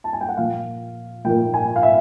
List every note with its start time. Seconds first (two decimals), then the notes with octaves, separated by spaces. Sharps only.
0.04 A5
0.13 G#5
0.21 G5
0.29 F#5
0.37 A#2 F3 A#3 F5
1.24 A#2 F3 A#3 G5
1.54 G#5
1.76 F5
1.83 E5